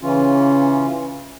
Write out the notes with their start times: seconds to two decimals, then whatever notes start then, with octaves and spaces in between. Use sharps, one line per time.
0.02 C#3 E3 C#4 F4